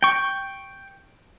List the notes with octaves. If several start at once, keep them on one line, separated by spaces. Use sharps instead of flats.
G5 C#6